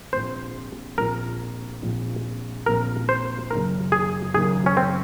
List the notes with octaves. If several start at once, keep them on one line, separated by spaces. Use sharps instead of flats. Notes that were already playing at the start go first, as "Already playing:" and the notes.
A#1 A#2 F3 C4 C5
A#1 A#2 F3 C4 A#4
A#1 A#2 F3 C4
A#1 A#2 F3 C4 A#4
C5
F#1 F#2 D#3 A#3 A#4
G#4
F#1 F#2 D#3 A#3 G#4
C#4
C4